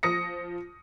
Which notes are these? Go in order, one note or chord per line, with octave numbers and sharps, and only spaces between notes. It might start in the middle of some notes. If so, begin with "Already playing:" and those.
F3 D#6 A#6 C#7